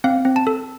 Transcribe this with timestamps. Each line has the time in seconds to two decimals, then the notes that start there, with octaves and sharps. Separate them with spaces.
0.04 C4 F5
0.25 C4
0.36 A5
0.47 A4